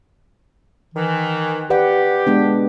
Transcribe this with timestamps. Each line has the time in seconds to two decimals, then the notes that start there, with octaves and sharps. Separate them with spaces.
0.95 D#3 E3
1.70 G4 B4 D5 F#5
2.27 G#3 B3 D4